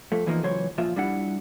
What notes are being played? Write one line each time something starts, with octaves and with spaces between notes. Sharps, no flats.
F2 A3
E2 A#2 E3 F3 A#3 D#4
C#2 E3 F#3 C5 C#5 C6
A#2 F3 F4 E5
G3 D4 E4 F#5